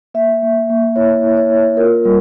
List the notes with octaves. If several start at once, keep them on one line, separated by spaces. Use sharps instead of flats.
A#3 E5
A#3
A#3
E4 C#5
E4
C#5
A#3
F4 A#4
G3 A#4